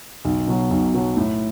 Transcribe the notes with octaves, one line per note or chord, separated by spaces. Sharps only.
B1
B2 F#3
B1
B2 F#3
A2